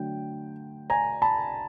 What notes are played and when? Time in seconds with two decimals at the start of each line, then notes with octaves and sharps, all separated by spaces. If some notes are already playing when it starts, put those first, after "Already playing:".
Already playing: D3 F#3 A3 G5
0.90 G#5 A#5
1.22 A5 B5